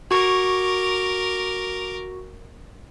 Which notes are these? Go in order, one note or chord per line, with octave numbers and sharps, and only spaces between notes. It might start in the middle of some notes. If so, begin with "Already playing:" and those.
F#4 A#4 C#6 D6